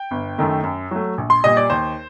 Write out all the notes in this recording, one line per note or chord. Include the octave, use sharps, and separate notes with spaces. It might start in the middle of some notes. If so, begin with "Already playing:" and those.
Already playing: G5
G1
F#2 D#3 A3
F#2
F#3 A3
A#1
C6
A#2 G3 D#5
D5
D#2 C5